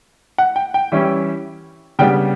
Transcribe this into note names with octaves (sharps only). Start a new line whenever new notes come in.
F#5
G5
G5
E3 G3 C#4 E4
C#3 G3 B3 D4 G5